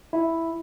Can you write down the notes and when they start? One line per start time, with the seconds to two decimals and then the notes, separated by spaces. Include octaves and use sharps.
0.13 E4